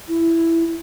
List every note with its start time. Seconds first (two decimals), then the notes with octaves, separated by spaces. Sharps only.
0.08 E4